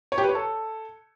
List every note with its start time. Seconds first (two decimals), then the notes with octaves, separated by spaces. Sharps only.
0.12 C#5
0.18 G4
0.23 B4
0.29 C#5
0.35 A4